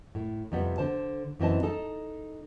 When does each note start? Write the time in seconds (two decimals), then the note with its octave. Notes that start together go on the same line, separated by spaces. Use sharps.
0.15 A2
0.52 F2 C3 G3 B3
0.78 D3 C5 A5
1.40 F#2 E3 C4 D#5 A5
1.63 D#4 A4 A5